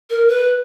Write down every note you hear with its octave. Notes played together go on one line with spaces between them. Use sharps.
A#4
B4